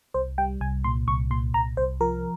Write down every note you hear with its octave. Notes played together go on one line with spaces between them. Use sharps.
C2 C5
G3 G5
C2 G#5
A#2 C6
C2 C#6
A#2 C6
C2 A#5
C2 C5
F3 A#4